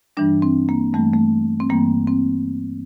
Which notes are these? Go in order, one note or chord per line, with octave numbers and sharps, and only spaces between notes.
G2 E3 G3 D4
C4
A#3
G2 E3 G3 A3
A3
C4
G2 E3 G3 A#3
C4